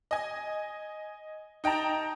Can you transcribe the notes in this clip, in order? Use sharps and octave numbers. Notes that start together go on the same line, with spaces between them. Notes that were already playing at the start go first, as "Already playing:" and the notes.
D#5 G#5
D#4 G5 A5 A#5